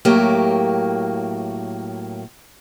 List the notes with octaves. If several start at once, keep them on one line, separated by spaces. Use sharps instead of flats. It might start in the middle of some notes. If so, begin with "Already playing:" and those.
A2 F#3 A#3 G4